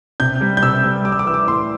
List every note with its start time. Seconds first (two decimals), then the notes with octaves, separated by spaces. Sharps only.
0.20 C3 G6
0.41 G3
0.57 G6
0.63 C3 E6
0.84 G3
1.05 G3 D6
1.12 E6
1.19 D6
1.26 E3 E6
1.34 D6
1.47 A2 C6